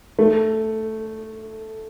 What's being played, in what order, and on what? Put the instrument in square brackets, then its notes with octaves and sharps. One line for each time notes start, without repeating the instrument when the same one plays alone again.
[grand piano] A3